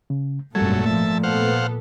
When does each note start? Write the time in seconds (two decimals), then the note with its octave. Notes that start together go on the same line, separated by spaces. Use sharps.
0.10 C#3
0.55 G#1 F#2 A#2 F#3 G3 A3 A4 G#6
0.86 F3 A3 E5 A5
1.23 B3 A4 C5 F5 F#5